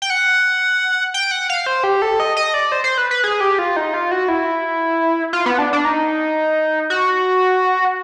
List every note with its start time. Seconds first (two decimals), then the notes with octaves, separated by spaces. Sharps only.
0.02 G5
0.10 F#5
1.14 G5
1.31 F#5
1.49 F5
1.66 C5
1.84 G4
2.02 A4
2.20 D#5
2.37 D#5
2.54 D5
2.72 C5
2.84 C5
2.98 B4
3.11 B4
3.24 G#4
3.41 G4
3.59 F4
3.76 D#4
3.94 F4
4.11 F#4
4.28 E4
5.33 F4
5.46 B3
5.59 D4
5.73 D4
5.85 D#4
6.90 F#4